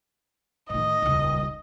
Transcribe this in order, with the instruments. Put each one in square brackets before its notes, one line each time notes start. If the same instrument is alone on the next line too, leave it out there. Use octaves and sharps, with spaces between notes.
[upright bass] A2 D#3 [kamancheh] D#5
[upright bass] D#1 C#2